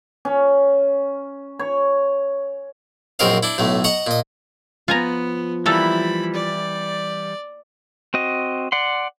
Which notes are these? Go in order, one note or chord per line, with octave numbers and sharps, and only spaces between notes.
C#4
C#5
A#1 F#2 C4 A#4 D#5 F5
D4 E4
B1 A2 A3
D#5 F#5 A#5 C#6
A#2 D#5
F3 B3 F4 G#5 A#5
E3 G3 A#3 E4 A4 B5
D5
C4 F#4 D#5
D5 F#5 C6